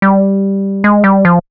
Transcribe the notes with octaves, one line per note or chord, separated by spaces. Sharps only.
G3
G#3
G3
F3